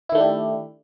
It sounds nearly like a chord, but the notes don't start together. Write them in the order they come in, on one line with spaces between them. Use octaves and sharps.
E4 D#3 A3 D4 G4